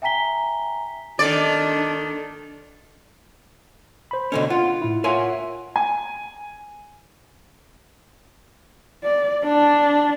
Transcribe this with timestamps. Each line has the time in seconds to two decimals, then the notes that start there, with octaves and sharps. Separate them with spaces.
0.02 E5 G5 G#5 A#5 B6 G7
1.19 D#3 D4 A4 D5
4.11 C5 B5
4.32 B2 D3 C#4
4.50 F4 F#5
4.82 A2 E4
5.04 F4 A#4 C#5 E5 F#5 G#5
5.76 G#5
9.03 D5
9.44 D4